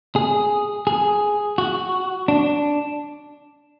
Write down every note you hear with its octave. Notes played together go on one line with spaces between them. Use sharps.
G#4
G#4
F#4
D4